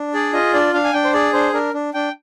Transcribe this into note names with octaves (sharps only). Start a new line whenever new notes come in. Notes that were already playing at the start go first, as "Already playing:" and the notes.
Already playing: D4
G#4 D5
F4 D#5
D4 D5
D4 F5
G#5
D4 G5
C5
G#4 D5
D4 C5
D4 A#4
D4
D4 G5